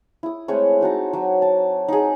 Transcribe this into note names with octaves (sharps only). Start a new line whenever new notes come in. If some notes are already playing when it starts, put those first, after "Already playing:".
E4 D#6
G#3 A3 C4 C#5
D#4 F#4 A5 A#5
F#3
A5
D#4 G#4